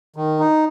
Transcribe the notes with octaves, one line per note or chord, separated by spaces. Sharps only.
D#3
D#4